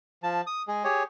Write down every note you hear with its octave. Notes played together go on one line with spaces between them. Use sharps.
F3 A5
D#6
G#3 G#4
G4 G#4 C#5